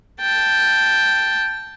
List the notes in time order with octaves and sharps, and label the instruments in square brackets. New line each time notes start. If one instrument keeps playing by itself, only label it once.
[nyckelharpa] G5 A5